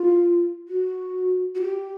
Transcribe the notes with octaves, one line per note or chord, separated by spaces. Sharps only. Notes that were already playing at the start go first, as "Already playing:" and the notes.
Already playing: F4
F#4
F#4
G4